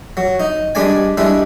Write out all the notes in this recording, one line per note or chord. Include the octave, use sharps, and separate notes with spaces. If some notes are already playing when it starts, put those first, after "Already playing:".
F#3
D#4
G3 G#3 D4 D5 G#5
G3 G#3 D4 E4